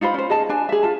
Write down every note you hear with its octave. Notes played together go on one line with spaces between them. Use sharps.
D#4 F4 C5 B5
C#4 C5
G#4 D#5 A5
D4 G#5
G#4 E5
F4 A5